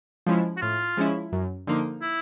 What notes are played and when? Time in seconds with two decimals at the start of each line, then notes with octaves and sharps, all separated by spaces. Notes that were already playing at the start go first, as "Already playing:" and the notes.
0.27 F3 G#3 C#4 E4
0.57 F#4
0.62 A2 F4
0.97 F3 G#3 C#4 E4
1.32 F#2
1.67 D3 F3 A#3 D#4
2.02 E4